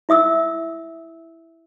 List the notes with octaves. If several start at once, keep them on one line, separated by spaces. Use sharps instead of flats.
E4 E5 D#6 E6